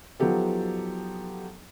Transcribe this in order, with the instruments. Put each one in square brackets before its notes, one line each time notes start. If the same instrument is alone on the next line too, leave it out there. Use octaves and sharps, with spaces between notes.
[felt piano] F3 F#3 B3 D#4 G4 A4